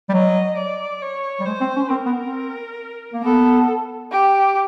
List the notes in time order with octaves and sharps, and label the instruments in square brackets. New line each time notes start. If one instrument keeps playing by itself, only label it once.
[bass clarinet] G3
[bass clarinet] F#3 [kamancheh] D#5
[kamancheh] D5
C#5
[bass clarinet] G3
[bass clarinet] G#3 [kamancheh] C5
[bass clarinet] C4
C#4
[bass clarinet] C4 [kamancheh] A#4
[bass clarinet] B3
C4
A#3
[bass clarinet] B3 [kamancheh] A4
[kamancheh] G4